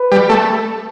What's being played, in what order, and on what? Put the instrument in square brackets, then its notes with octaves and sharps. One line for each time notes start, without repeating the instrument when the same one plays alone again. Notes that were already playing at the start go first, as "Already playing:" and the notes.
Already playing: [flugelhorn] B4
[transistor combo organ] G3
A3